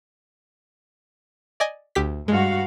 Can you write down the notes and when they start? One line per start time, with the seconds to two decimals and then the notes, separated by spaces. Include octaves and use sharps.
1.60 D5 D#5 G#5
1.95 D2 G4 B6
2.28 G2 G#3 F#4 F5